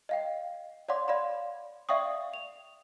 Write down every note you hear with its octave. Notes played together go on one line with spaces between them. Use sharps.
D#5 F5 G5
C#5 D5 F5 F#5 C6 D6
D5 F5 B5 C6
D5 E5 F5 G5 C#6 D#6
F7